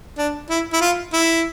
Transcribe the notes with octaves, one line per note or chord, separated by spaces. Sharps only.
D4
E4
E4
F4
E4